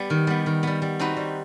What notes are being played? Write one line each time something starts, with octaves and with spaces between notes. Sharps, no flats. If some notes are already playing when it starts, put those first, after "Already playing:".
Already playing: G3 B3
D#3
G3 B3
D#3
G3 B3
G3
C4 D#4 F#4 B4
G3